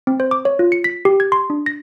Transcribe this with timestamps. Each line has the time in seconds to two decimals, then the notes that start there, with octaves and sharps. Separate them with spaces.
0.07 C4
0.20 C5
0.31 D6
0.45 C#5
0.59 F4
0.72 C#7
0.84 B6
1.05 G4
1.20 G#6
1.32 C6
1.50 D4
1.66 A#6